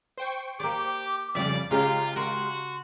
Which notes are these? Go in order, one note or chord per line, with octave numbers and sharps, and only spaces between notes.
C5 G5 C#6
A#3 G4 D5 D6
F2 C#3 G3 D5 E5
C#3 G#3 F4 G4 F5 A#5
F#4 A#4 C6